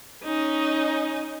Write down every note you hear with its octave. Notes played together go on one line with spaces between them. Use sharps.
C#4 D#4